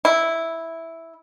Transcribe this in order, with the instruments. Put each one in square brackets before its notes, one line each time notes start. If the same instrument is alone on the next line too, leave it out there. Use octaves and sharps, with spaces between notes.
[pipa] E4